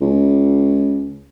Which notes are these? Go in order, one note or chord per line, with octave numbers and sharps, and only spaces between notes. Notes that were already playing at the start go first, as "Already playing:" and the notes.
C#2